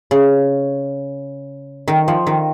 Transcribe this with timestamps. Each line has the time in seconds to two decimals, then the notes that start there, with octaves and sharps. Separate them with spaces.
0.11 C#3
1.88 D#3
2.08 F3
2.27 D#3